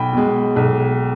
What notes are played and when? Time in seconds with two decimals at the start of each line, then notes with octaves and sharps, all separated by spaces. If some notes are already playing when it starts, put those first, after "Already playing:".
Already playing: B1 G5 B5
0.13 B2 G#3
0.56 B1